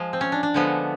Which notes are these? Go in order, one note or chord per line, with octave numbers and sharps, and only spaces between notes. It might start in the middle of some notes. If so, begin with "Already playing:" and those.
Already playing: F3 G#3
C4
C#4
D4
D4
D3 F3 G#3 B3